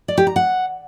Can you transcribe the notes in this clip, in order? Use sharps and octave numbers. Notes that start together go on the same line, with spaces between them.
D5
G4
A#5
F#5